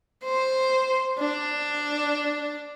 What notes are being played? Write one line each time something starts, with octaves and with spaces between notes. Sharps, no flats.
C5
D4